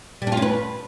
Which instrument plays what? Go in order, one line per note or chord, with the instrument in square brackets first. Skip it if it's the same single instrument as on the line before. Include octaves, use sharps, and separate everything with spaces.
[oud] G3
D4
F4
C#4
B4